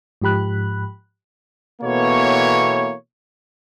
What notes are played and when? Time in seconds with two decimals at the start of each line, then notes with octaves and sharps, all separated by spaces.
0.22 G#2 F3 G4 B5 F#6
1.82 B2 E3 A#3 B3 A4 C#5